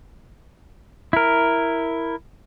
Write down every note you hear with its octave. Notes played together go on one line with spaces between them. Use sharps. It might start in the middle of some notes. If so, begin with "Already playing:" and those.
E4 A#4